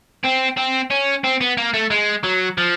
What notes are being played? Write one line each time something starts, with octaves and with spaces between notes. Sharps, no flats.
C4
C4
C#4
C4
B3
A#3
A3
G#3
F#3
F3